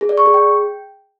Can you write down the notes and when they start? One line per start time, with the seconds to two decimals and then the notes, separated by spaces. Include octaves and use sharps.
0.01 G#4
0.09 D5
0.18 C#6
0.26 G#4
0.34 G5